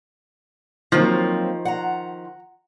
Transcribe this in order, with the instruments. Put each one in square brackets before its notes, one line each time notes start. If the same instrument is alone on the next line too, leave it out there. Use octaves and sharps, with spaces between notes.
[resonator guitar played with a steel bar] D#3 F3 F4 [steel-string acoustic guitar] F#3 A#3 C4
[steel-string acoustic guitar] F#5 A#5